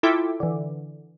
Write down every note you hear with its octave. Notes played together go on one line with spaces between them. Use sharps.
E4 F4 A4 E5 G5 D6
D3 E3